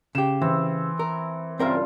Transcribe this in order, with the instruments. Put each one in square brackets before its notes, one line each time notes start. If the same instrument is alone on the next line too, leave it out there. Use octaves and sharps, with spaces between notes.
[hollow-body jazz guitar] C#3 G4 [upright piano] E7
[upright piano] E3 [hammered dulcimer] C4
[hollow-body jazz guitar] A#4
[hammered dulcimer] G2 C#3 F4 [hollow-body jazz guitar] C4 A#4 E5